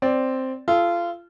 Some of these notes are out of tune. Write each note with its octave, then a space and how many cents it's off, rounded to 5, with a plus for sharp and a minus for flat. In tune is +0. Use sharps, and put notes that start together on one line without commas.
C4 +0 D5 +0
F4 -25 A4 -25